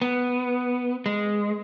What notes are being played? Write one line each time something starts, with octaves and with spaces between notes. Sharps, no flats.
B3
G#3